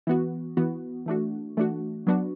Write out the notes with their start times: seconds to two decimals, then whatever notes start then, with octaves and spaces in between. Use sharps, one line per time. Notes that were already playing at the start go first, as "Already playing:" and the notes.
0.07 E3 B3 F#4
0.57 E3 B3 F#4
1.06 E3 A3 D4 F#4
1.57 E3 A3 D4 F#4
2.07 F#3 B3 D4 F#4